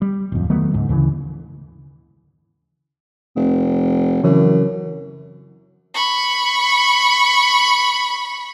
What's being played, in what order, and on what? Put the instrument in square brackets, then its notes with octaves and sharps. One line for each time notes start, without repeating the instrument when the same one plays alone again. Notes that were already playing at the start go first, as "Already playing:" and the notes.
[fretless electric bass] G3
D1 F2
D#3 F#3 A3 B3
C#2 G#2
D2 C#3 E3
[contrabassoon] F1
[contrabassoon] F#2 [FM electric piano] C#3 E3 F#3
[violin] B5 C#6